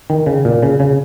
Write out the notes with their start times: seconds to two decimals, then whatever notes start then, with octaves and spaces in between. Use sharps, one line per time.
0.10 D#3
0.26 C#3
0.45 A#2
0.63 C#3
0.80 C#3